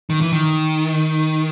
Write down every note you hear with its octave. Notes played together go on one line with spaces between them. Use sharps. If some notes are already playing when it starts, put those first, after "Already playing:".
D#3
E3
D#3